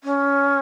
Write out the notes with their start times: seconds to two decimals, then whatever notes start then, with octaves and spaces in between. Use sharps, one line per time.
0.04 C#4